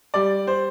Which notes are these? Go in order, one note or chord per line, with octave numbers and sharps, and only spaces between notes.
G3 D5
C5